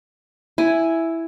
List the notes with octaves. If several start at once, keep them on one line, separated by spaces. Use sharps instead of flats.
E4 G#5